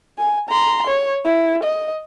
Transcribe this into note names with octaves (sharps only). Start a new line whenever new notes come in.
G#5
A#5 C6
C#5
E4
D#5